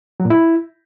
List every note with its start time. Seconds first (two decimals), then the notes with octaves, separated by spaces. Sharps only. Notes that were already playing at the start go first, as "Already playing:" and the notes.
0.20 F#3
0.25 A#2
0.30 E4